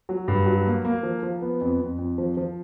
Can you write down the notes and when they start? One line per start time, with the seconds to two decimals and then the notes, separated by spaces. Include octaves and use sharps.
0.09 F#3
0.28 G2
0.46 F#3
0.66 A#3
0.85 A#3
1.03 F3
1.23 F3
1.42 B3
1.61 F2
1.79 F2
1.98 F2
2.18 F3
2.37 F3